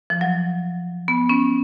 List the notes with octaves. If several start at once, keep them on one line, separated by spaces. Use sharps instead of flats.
F3
F#3
B3
C#4